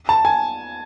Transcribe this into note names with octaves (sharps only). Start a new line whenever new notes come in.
A5
G#5